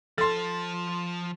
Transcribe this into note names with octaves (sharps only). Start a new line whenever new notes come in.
F3 A4 A5 C6 A6